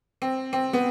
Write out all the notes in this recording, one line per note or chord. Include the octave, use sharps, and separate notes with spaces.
C4
C4
B3